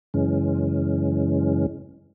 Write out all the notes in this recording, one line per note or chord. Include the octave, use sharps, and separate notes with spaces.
F#2 C#3 E3 G#3 C#4